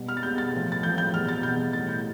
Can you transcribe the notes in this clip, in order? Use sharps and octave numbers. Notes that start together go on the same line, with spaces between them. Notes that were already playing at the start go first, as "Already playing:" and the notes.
Already playing: B2 G3
F6
A6
B2 G3 G6
A6
A2 F3
A6
A2 F3 G6
G6
E2 B2 G3 F6
A6
E2 B2 G3 G6
A2 E3 G3 A6
G6